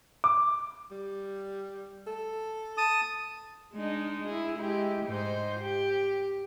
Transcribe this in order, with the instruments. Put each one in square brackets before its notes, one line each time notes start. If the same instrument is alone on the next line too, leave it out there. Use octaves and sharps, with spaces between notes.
[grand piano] D6
[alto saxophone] G3
A4
[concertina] A5 D#6
[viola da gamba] G#3 D4 D#4
E4 G#4
G#3 E4 G4
G#2 D#4 C5
G4